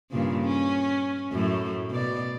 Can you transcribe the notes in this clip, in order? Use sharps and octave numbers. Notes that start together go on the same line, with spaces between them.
G2 A#2 C#3
C#4
F#2 A2 A3
B2 D5